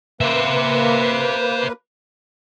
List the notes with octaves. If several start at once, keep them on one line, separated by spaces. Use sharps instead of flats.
A#3 B4 C5 E5